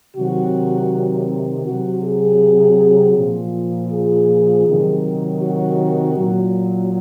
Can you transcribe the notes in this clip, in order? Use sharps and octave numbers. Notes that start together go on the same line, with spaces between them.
C3 D#3 F#3 F#4
C3 F#3 F#4
G#4
A#2 F3
G#4
C3 D#3 F#3
F#4
A#2 F#3